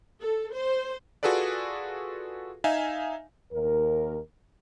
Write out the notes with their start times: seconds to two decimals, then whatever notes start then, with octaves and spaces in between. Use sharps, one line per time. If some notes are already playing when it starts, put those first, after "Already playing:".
0.21 A4
0.54 C5
1.23 F4 F#4 G#4 A4 B4 D5
2.64 D#4 E5 F5 G#5
3.53 D#2 A#4